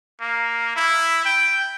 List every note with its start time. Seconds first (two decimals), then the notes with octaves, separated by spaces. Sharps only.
0.21 A#3
0.76 E4
1.25 G5